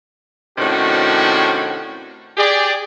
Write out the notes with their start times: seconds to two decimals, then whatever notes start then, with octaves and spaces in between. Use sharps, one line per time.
0.58 A2 C3 D#3 C#4 D4 F#4
2.37 G4 G#4 D5